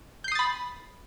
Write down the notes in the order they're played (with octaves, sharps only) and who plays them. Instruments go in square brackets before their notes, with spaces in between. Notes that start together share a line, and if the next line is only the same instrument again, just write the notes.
[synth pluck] G6
C7
D#6
A6
B5